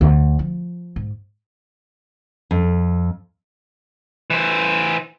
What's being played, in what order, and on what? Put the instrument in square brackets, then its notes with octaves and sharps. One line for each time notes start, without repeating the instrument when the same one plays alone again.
[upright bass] D2
F3
G#2
[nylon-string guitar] F2
[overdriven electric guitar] E3 C5